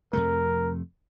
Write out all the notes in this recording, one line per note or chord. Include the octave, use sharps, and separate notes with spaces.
F2 C3 A3 A#4